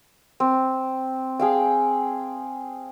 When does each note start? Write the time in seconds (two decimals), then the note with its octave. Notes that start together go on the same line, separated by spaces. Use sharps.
0.40 C4
1.39 G#4 F5 G5